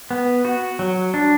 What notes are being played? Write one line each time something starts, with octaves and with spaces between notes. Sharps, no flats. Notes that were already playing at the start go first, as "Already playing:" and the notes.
B3
F#4
F#3
D4